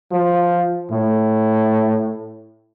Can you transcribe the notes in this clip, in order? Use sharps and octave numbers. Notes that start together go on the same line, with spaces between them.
F3
A2